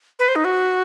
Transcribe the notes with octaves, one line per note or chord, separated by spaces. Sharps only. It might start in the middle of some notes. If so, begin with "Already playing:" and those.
B4
C5
D#4
F#4